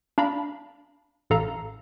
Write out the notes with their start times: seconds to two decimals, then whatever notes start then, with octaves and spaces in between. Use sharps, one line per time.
0.18 D4 F5 A#5 B5
1.30 A1 A2 A4 F5 A#5